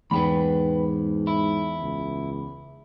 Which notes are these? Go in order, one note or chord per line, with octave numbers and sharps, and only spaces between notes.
E2 G#2 B4 G5 B5
E4
C#2